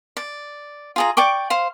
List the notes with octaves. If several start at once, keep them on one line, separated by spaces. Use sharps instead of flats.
D5
F4 G#4 A#5
D5 G5 C#6 D6
C5 F5